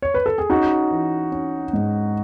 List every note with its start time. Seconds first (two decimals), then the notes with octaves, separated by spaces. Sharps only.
0.02 C#5
0.14 B4
0.26 A4
0.38 G#4
0.50 C#4 D#4 F#4
0.91 E3
1.32 C#4
1.73 G#2